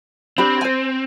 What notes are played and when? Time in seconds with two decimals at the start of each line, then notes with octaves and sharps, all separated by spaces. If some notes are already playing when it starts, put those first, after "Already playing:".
0.38 C4 D4 G4 B5
0.61 C5 G#5